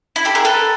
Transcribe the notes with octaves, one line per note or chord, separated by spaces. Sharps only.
E4
G4 A4
G#4 A#4
A4 B4